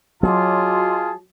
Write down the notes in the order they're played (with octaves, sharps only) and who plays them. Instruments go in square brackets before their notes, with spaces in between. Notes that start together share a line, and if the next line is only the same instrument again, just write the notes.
[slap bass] F#3 [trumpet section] F4 G#4 A5 [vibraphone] D#5 C6 D6